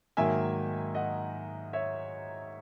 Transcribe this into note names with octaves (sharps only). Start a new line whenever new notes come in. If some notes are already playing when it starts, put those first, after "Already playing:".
G#2 D#3 F#3 A#3 E5 G#5
D#5 F#5
C#5 E5